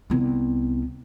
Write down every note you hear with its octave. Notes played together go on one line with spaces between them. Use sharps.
C2 B3